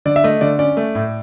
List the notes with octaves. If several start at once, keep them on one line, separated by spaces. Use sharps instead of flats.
D3 D5
E5
A3 D#5
D3 D5
C#4 D5
A3
A2